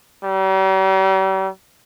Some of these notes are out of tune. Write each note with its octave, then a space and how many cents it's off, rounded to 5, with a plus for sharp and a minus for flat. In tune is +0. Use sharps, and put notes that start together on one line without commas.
G3 -45